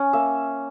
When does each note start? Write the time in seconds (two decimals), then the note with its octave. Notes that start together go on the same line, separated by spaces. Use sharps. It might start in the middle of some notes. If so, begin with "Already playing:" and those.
Already playing: C#4
0.13 A#3 E5